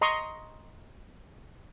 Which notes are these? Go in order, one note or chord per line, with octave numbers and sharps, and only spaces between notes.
D#5 A#5 C6 C#6 D#6